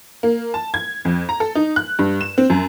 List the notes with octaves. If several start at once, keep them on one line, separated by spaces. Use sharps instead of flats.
A#3
A5
G#6
F2
A#5
A4
D#4
F#6
G2
E7
C4
F#2